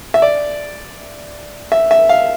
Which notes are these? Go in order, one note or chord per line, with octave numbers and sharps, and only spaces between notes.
E5
D5
E5
E5
F5